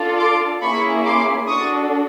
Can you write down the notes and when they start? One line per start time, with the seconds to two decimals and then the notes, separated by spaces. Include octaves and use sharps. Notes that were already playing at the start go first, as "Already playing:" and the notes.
Already playing: D4 F4 A4
0.18 C6 D6
0.61 A#3 C#4 E4 G#4 B5 C#6
1.04 C6 D6
1.47 D4 F#4 A4 C#6 D#6